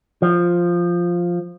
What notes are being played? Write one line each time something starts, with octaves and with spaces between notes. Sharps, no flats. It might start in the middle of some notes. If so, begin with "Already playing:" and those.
F3